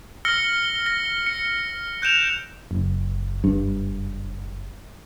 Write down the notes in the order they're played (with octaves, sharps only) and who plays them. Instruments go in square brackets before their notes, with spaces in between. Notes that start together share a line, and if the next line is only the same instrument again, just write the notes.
[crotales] E6 F6 A#6 C#7 G7
A#6
C#7
F#6 G6 D7 E7 F7
[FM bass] F#1
[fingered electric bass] G2